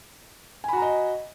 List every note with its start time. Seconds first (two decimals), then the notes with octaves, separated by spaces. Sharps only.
0.64 G#5
0.68 B5
0.73 F#4
0.77 A#5
0.82 D#5